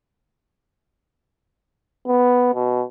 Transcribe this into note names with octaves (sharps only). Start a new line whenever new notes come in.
B3
B2